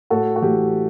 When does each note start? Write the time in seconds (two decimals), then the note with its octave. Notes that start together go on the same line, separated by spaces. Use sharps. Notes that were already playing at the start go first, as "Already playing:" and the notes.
0.10 A2 F#4 A4
0.36 F#4
0.42 E3 A3 G4